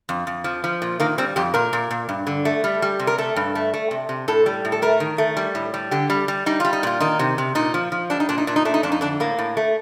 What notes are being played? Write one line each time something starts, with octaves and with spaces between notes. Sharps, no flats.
F2
F2
F3
F3
A#2
D#3 A#3
G3 C4
F2 G4
A#2 A#4
A#2
A#2
G2
D3
A3
G3
G3
C3
A#4
A3 A4
G2
A3
A3
C3
C3
A2 A4
G3
A2
A4
A3 A#4
D#3
A3
G3
A2
G3
D3 G4
G3
G3
G3 D#4
G3 F4
D#4
A#2 F4
D#3 D#4
C3
C3
A#2 D#4
F3
F3
G3 D4
D#4
A#2 D4
D#4
A#2 D4
D#4
A3 D4
D#4
F2 D4
D#4
D3 D4
A2 A#3
A2
A3